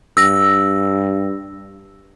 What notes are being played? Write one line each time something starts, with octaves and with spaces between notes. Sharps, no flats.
G2 E6 A#6